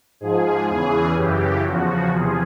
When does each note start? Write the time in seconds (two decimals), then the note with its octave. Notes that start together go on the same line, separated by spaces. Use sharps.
0.20 G#2 F3 G#4
0.68 E2 C#3 E3 G#4
1.16 F#2 C#3 E3 G4
1.65 E2 C#3 F3 F#4
2.13 E2 C3 F3 G#4